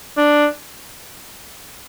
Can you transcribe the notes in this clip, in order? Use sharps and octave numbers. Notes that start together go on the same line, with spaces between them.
D4